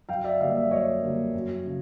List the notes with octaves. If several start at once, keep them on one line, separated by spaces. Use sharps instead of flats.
F#2 F5 G5
D5 E5
D3 G3 A#3 D#5 F5
D5 E5
F#2 C#5 D#5
D3 G3 A#3
F#2
C#3